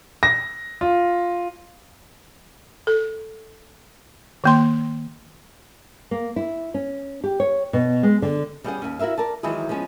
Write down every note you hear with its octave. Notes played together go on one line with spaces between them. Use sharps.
A#6
F4
A4
D#3 A#3 C6
A#3
E4
C#4
G4
C#5
B2
G#3
D3
G3 B3 C#4 G4 G#4 F#5
D#2 C#4
E4 F#4 A#4 E5 F5
A#4 D5 A5
D#3 E3 F#3 G#3 E4 G#4
F3 G#3 B3 C#4